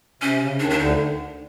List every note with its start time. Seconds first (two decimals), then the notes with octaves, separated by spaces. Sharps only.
0.22 C3 C#4
0.41 C#3
0.60 D#2 D#3 D4
0.70 D4
0.78 D2 D3 D#4